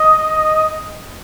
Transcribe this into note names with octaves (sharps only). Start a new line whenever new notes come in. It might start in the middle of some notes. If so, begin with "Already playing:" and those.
Already playing: D#5